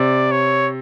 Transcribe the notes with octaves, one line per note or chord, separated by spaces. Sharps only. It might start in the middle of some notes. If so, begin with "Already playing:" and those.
Already playing: C3 D5
C#5